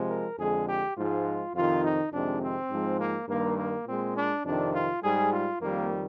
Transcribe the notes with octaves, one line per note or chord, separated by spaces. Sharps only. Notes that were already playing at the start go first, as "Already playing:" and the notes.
Already playing: C3 F3 G#3
A#4
F2 D3 G#3 G#4
G4
G#2 F3 G#3 F4
F2 C3 D#3 F4
D#4
F2 C3 D#3 G#3 D4
C4
G#2 F3 G#3
A#3
G2 D#3 G3 A#3
A#3
A#2 G#3 C4
D4
F2 C3 D#3 D4
F4
G#2 G3 G#4
F4
F2 D#3 G3 A#3